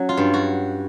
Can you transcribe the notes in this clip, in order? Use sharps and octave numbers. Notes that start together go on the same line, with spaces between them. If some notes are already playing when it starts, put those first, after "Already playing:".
Already playing: F#3 C#4
F4
G2
F#4